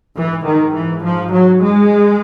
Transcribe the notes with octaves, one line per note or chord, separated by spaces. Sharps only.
G#2 E3
D#3
E3
F3
F#3
G#3